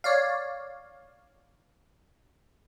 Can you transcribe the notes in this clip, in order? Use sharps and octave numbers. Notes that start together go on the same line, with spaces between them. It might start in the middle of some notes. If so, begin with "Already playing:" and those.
C#5 D5 F5